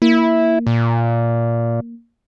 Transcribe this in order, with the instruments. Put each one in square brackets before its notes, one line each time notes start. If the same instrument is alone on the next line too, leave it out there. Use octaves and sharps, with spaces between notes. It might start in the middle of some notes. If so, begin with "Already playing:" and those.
[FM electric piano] A#3 [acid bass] E4
[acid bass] A#2